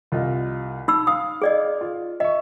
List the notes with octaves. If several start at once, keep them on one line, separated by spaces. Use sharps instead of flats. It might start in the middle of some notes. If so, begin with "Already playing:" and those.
C2 F4 D#5
D#4 B5 E6
F5 D#6
G#4 D5 D#5
F4
D#5 E5 C#6